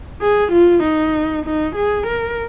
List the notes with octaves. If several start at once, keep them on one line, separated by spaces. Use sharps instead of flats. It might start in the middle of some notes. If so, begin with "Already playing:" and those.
G#4
F4
D#4
D#4
G#4
A#4